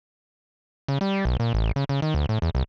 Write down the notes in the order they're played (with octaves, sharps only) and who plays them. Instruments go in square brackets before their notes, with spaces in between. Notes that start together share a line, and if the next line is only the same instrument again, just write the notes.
[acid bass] C#3
G3
B1
A#2
A1
C#3
C#3
D#3
D2
A2
E2
C2